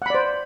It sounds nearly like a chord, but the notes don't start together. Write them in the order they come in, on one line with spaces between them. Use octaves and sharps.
F#5 B5 D5 C5